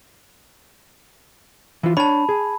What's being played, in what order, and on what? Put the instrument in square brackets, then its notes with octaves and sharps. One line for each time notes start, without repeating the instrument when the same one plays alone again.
[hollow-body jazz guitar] E3 F4
[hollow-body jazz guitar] D4 C#5 [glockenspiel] A5 B5
[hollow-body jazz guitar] G#4